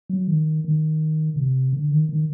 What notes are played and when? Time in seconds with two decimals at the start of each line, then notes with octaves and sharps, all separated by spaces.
0.10 F#3
0.28 D#3
0.64 D#3
1.36 C3
1.73 D3
1.91 D#3
2.09 D#3